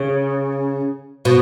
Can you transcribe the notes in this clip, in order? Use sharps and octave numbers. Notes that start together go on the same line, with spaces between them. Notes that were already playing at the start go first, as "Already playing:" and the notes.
Already playing: C#3
B2